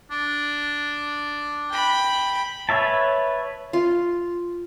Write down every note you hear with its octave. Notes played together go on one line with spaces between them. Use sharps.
D4
G5 B5
B4 C#5 E5 A5
F4